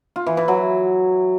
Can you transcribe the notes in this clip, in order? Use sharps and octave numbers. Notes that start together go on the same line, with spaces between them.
F4
E3
E3
F#3